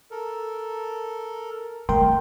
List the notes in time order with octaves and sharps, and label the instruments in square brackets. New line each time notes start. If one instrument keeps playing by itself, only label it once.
[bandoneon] A4 A#4
[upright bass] A3 [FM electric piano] A#4 [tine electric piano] G5 C6